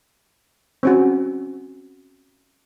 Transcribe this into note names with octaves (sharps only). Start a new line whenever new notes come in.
C4 C#4 F#4